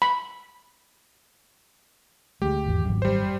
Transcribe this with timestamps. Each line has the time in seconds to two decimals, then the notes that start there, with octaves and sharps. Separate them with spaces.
0.02 B5
2.42 D2 G#3 G4
2.66 G#1 E2
2.85 G#1 F#2
3.02 G3 C5